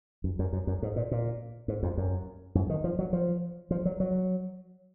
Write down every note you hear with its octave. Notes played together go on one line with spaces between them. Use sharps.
F#2
F#2
F#2
F#2
G#2
A#2
A#2
G#2
F2
F#2
F#2
D#3
F3
F#3
F3
F3
F#3
F#3